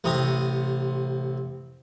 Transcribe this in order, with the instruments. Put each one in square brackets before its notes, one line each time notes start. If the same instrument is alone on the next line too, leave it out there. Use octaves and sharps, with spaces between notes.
[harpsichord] A1 C3 A#5 D#6